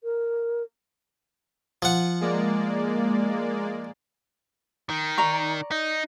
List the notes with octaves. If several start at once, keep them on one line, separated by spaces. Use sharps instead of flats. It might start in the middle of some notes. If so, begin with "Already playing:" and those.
A#4
F3 F#5
G#3 A#3 D5
D#3
D5 A#5 C#6
D#4